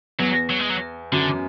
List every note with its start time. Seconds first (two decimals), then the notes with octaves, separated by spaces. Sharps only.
0.19 E2 F#3
0.50 F#3
0.60 G#3
0.70 F#3
1.12 F#2 D3